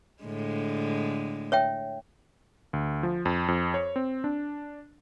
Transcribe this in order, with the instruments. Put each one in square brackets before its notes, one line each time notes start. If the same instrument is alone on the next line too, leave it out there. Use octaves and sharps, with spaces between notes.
[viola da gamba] A2 D3 G#3
[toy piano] C#5 E5 G5
[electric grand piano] D2
F3
F2
F2
C#5
C4
D4